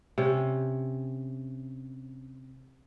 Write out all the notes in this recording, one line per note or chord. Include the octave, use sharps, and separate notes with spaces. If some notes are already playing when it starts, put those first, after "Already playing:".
C3 C#4